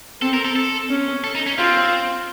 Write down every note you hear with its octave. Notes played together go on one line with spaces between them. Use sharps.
C4 A4
A#4
A4
A4
C#4
A4
D#4
C#4
C4 F4